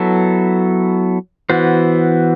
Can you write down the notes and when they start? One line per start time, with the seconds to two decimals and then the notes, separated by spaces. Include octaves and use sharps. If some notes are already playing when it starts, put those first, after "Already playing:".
Already playing: F#3 B3 E4 A4
1.50 E3 B3 F#4 C5